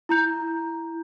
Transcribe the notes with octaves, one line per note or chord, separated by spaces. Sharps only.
E4 A#5 G6